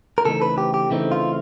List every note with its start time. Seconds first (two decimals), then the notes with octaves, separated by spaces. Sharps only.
0.18 A#4
0.25 C#3 E3 A3 C4 D#4 A4
0.42 B4
0.58 G4
0.74 G4
0.90 C#3 E3 A3 C4 D#4
1.12 F4